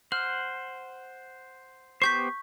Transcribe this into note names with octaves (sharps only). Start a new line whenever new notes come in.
C5 F#5 F6
B3 G4 C5 C#6 G6 B6